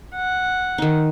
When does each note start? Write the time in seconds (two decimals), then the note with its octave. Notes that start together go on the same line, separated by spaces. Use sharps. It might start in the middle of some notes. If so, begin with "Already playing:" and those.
0.16 F#5
0.78 D#3 D#4